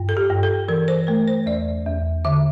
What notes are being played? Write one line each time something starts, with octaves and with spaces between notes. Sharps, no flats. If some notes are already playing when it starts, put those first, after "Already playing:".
Already playing: G2
A4
G4
G2
A4
E3 A#4
C5
A3 A#4
C5
E2 D5
E2
D3 E5